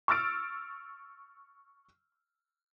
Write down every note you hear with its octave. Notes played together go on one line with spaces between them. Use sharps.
C#6 E6 F6 A6 D7